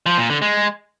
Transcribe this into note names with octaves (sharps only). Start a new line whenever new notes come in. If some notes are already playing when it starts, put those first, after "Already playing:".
F3
A#2
D3
G#3